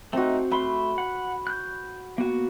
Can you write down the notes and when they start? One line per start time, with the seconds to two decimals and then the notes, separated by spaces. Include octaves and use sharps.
0.13 A3 C4 D#4 F#4
0.52 A3 B5 C6
0.98 F#5
1.47 F#6 G6
2.18 A#3 B3 F#4